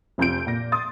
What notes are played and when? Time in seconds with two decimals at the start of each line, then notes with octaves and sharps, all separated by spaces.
0.18 F1 F2 F4 G6 D7
0.47 A#2 A#6
0.72 C6 D#6 A6